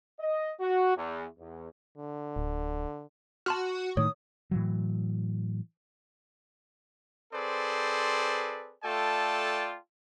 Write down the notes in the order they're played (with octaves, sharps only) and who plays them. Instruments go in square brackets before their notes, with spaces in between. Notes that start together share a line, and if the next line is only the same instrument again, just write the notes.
[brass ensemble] D#5
F#4
E2
E2
[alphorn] D3
[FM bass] D1
[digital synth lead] F#4 [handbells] A5 C6 F6
[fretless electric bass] A2 D#3 [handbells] C#5 [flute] D#6
[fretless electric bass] A2 E3 F#3
[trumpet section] C4 G#4 A4 B4 C5 D5
A3 F4 A4 D5 G5 A5